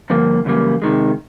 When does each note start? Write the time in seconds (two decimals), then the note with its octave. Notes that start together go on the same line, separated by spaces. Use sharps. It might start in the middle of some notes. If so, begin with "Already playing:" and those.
0.10 G2 D3 F3 A#3
0.45 F#2 C#3 E3 G3 A#3
0.82 C3 D#3 G#3